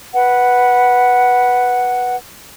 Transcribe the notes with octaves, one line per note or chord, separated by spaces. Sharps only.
B4 F#5